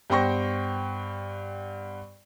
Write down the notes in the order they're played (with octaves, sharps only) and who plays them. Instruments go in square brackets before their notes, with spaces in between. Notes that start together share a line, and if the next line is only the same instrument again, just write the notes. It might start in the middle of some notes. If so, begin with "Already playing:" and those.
[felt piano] G2 B3 C5 G5 C#6 A#6